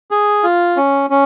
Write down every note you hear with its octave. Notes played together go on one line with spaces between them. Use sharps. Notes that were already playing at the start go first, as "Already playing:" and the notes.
G#4
F4
C#4
C#4